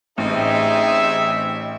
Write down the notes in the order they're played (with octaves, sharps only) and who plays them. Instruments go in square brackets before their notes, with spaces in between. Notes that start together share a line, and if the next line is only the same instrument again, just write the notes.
[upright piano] A1 [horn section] C4 D#4 G#4 [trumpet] E5